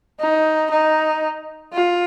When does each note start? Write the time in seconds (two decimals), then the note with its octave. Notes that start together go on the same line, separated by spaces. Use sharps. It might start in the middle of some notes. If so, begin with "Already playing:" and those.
0.20 D#4
0.71 D#4
1.73 F4